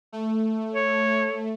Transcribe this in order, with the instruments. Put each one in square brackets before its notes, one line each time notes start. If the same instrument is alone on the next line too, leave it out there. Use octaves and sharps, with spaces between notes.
[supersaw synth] A3
[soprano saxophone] C#5